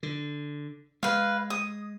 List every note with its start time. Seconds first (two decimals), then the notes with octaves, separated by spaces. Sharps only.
0.03 D3
1.03 G#3 B4 F5
1.50 D#6